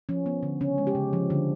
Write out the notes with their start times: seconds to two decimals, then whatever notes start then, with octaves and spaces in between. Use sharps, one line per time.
0.09 F3 C#4
0.26 B3
0.43 D3
0.61 C#3 C#4
0.78 G#3
0.87 G4
0.95 C#3
1.13 F3
1.30 D3